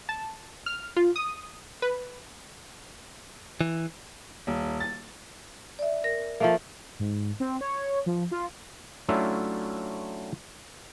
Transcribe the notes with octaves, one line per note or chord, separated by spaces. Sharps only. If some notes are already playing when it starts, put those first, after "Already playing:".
A5
F6
F4
D#6
B4
E3
D#1
A6
D5 E5
A#4 A#6
F3 A3 A#3
G#2
C4
C#5
F3
F4
F#3 A3 C#4 D4 E4 F4